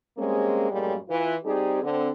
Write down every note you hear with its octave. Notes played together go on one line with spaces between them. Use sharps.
G3 G#3 A#3 C4 C#4 G#4
F#2 A2 G3 G#3 A#3
E3 F4 B4
G3 C4 D#4 G4 G#4
D3 C4